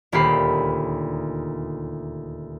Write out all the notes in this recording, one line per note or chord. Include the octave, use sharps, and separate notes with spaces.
D#1 D2 A#3 G4 B5 C7